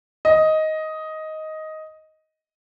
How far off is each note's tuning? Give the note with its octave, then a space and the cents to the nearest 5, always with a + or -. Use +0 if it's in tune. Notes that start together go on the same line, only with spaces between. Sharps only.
D#5 +10